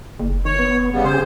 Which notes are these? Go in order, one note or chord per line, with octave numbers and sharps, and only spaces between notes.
F#1
D#3 C#5
B3
C#3 G3 B3
C#3 G4 G#4 C5